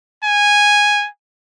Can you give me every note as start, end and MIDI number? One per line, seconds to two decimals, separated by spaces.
0.25 1.08 80